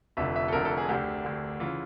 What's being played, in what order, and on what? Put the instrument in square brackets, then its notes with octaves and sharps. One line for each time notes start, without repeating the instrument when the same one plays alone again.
[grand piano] F1 F2 D3 E5
E5
A4
F1 F2 D3 A#4
A4
G#4
D2 D3 G4
D2 D3
C#3 E3 F4